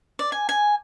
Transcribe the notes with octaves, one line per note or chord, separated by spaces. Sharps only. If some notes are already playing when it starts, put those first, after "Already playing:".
D5
G#5
G#5